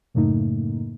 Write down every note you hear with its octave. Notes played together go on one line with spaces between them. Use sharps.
F#2 A2 C#3 A3 A#3 D#4